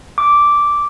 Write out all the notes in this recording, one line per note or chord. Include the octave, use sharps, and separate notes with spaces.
D6